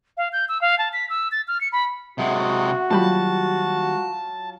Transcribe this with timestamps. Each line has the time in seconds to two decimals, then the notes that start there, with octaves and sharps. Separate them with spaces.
0.17 F5
0.33 G6
0.49 E6
0.61 F5
0.78 A5
0.93 B6
1.10 E6
1.32 A6
1.48 F6
1.61 C#7
1.72 B5
2.18 C3 G#3 F#4 E5 F#5
2.91 D#2 F#3 G3 F4 A5 B5